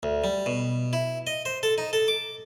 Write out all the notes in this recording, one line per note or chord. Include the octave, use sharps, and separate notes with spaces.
D2
G3
B2
E4
D#5
C5
A4
D#4
A4
D6